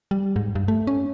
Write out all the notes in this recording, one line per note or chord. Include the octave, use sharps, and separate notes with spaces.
G3
G#2
G2
A3
C#4